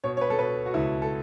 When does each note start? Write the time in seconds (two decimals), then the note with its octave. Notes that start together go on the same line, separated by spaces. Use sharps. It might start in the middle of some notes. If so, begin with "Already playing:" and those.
0.04 B2 C#5
0.17 C#5
0.21 B4
0.30 A4
0.39 B2 B4
0.66 F#4
0.74 C#2 E4
1.02 A4